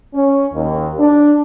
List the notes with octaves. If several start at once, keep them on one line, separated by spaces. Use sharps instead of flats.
C#4
D#2
D4